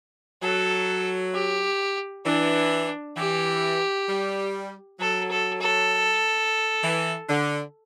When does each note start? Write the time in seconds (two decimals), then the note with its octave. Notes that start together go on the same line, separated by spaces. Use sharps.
0.42 F#3 A4
1.34 G4
2.25 E3 D4
3.17 E3 G4
4.09 G3
5.00 F#3 A4
5.31 A4
5.61 A4
6.84 E3
7.29 D3